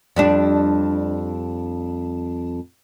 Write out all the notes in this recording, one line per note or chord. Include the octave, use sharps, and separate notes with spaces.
F2 G3 D4